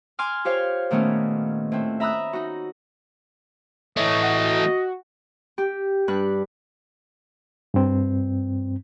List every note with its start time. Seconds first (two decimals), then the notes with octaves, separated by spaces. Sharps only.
0.19 G#5 C6 D6 F6
0.45 F4 G4 C5 C#5 F5
0.91 A#2 D#3 A3 B3 C#4
1.72 A2 C4
2.00 E5 A#5 B5 D#6 E6 F#6
2.33 D#4 F#4
3.97 E3 A3 C#5 D#5
4.23 F#4
5.58 G4
6.08 G2 D4 B4 F#6
7.74 G2 C4